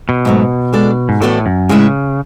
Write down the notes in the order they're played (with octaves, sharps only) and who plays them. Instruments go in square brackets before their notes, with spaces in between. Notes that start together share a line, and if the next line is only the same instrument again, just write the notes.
[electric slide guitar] B2
[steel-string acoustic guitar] G#2 F#3 A3
G#3 D4 A4 D5
[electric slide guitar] G#2
[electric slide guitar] A2 [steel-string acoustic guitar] E3 B3 F#4 A4 D5
[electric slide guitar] F#2
[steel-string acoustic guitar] A2 G#3 C#4 E4 B4 [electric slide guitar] C#3